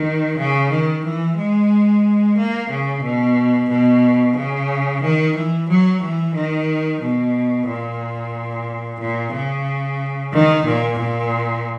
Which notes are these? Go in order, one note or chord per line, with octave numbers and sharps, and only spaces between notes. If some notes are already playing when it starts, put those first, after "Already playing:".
Already playing: D#3
C#3
D#3
E3
G#3
A#3
C#3
B2
B2
C#3
D#3
E3
F#3
E3
D#3
B2
A#2
A#2
C#3
D#3
A#2
A#2